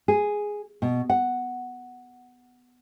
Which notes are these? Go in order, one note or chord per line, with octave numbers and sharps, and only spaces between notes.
G#4
B2
F#5